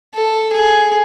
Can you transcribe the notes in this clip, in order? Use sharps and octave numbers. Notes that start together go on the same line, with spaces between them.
A4
G#4